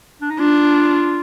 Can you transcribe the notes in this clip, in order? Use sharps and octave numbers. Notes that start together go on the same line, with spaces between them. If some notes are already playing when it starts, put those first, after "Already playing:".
D4
D#4
D4 F4